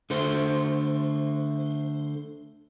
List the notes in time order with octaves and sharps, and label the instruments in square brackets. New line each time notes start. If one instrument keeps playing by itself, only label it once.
[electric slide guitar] D3 A3 C5